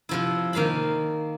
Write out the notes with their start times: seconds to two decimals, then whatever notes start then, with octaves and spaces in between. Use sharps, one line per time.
0.09 C3 F3 E4
0.53 D#3 A#3 F5 A5 B5